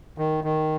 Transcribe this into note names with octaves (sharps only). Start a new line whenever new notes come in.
D#3
D#3